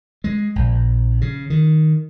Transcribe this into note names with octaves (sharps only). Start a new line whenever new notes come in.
G#3
A#1
C#3
D#3